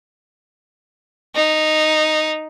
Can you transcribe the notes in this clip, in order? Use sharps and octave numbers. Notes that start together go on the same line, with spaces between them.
D#4